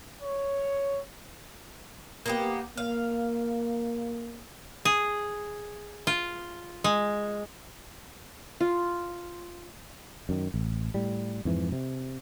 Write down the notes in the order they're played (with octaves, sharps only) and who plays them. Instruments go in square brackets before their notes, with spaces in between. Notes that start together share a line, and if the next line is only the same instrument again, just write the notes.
[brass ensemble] C#5
[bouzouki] A#3 B3 G4
[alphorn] A#3 [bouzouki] F5
[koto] G#4
F4
G#3
[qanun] F4
[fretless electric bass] F#2 D#3
A1
A2 G3
F2 G#2 E3
C3